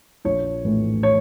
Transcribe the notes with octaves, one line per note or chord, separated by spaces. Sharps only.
A#1 C#5
A2 E3 A3
C#5